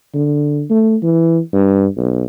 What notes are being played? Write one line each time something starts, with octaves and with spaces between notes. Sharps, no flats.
D3
A3
E3
G2
B1